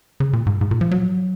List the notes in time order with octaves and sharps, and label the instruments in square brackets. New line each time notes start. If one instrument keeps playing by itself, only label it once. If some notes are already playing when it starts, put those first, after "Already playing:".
[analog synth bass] C#3
A#2
G#2
G#2
A#2
F3
F#3